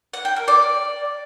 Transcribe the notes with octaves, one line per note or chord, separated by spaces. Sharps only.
F#5
G5
A#4
D5